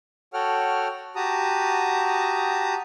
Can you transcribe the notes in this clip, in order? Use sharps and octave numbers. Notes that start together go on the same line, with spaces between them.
F#4 A4 C#5 F#5 G5 F6
F#4 G4 A5 A#5 D#6